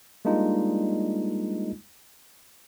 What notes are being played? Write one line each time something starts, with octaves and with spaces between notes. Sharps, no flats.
G3 G#3 A#3 D4 D#4 F4